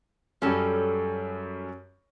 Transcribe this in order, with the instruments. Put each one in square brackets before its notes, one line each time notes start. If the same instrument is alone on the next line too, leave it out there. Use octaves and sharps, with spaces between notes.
[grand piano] F#2 G3 [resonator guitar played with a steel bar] C#4 A4